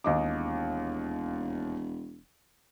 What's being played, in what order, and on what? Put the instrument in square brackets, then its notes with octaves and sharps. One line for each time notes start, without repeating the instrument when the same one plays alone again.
[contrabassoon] E1 [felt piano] D#2 D#5 D6